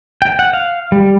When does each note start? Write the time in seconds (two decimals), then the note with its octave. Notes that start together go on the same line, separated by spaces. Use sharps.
0.22 G5
0.39 F#5
0.53 F5
0.92 G3